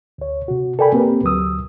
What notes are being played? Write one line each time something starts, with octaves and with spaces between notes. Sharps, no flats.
D2 C#5
C3 F#4
A4 A#4 D5 G5 G#5 B5
A#3 C4 G4 A#4 B4
D2 F#3 D#6 E6